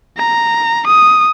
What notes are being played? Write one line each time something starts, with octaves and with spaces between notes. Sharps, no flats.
A#5
D#6